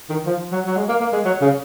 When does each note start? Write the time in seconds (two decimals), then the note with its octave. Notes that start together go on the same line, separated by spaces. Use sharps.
0.10 D#3
0.26 F3
0.52 F#3
0.67 F#3
0.77 G#3
0.89 A#3
1.01 A#3
1.13 G#3
1.25 F#3
1.42 C#3